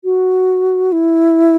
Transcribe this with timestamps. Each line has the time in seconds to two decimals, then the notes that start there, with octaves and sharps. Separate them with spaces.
0.04 F#4
0.92 E4